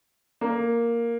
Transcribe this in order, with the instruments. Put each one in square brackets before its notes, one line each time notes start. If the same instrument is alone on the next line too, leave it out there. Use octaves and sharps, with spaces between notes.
[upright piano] A#3